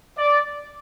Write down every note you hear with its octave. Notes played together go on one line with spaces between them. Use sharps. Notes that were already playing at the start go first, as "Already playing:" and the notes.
D5